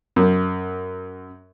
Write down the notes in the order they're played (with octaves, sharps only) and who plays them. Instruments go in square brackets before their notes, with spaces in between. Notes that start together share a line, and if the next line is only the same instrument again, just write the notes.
[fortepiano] F#2